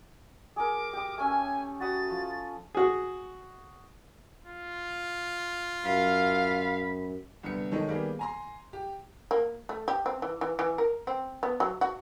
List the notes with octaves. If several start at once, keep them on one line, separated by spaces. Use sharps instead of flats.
G#4 A#4 D6
G4 D#6
A3 C#4 A4 G#5
F#4 B5 D#6 A6
F3
F#4 G#4
F4
F#2 F5 B5
C2 D3 B3 C#7
D#3 G#3 D#4 A4 C#5
D#3 G3 A#3 B3 G#4
G#5 A#5 C6
G4
A#3
A3
G4
C4
E3
E3
E3
A#4
C4
B3
F#3
F#4